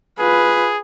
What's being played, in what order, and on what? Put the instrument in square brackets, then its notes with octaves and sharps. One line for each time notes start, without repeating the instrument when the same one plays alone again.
[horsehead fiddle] F4 B4 [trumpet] G#4